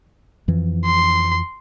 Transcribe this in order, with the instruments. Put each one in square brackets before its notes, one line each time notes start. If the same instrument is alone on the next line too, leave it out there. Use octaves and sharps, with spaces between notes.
[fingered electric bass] F2 E3 F3
[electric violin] C6